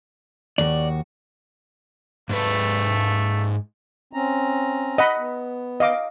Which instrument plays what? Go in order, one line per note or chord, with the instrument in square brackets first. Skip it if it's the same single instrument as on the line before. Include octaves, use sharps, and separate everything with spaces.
[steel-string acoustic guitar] D#2 F#4 [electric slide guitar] D5
[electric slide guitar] G#2 G#3 B4 [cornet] A3
[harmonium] C4 C#4 A#5
[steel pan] D#5 F#5 B5
[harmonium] B3
[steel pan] D#5 F5 D6